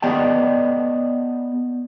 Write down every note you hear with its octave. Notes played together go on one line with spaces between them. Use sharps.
B3 G4 D5 D#5 G5 A5